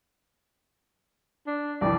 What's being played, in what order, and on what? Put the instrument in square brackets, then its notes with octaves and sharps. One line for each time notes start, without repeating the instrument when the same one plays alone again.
[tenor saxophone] D4
[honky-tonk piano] C2 F2 E3 [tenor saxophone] D5